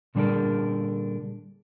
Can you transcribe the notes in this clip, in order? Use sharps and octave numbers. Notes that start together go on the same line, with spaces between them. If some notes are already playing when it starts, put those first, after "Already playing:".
A#2 D3 G3 D4 G#4 A#4